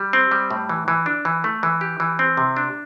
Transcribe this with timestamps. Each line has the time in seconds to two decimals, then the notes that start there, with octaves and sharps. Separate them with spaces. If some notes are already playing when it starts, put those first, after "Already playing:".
Already playing: G3
0.13 C4
0.31 G3
0.51 A2
0.69 E3
0.88 E3
1.06 D4
1.25 E3
1.44 A3
1.63 E3
1.81 G4
2.00 E3
2.19 C4
2.37 C3
2.57 D4